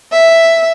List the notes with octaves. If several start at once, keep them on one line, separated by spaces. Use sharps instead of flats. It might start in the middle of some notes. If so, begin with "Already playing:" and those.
E5